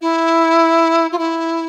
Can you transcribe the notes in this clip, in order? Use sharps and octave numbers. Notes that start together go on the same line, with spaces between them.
E4
F4
E4